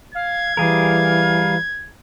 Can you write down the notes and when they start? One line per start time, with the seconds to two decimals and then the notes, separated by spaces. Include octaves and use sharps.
0.15 F5 G#6
0.57 E3 G3 G#4 A#4 F5